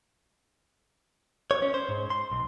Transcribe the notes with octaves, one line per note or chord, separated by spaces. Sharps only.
C#5
C#4
C5
G#2
C6
B1